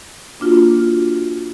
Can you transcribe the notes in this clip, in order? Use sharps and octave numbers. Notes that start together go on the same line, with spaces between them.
A#3 D4 F4 F#4